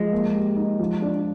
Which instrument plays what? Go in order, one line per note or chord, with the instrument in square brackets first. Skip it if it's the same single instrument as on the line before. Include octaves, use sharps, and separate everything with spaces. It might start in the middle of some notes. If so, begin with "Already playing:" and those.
Already playing: [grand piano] F3 [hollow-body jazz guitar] G#3
[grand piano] A#3
G4
D#4
F3
D4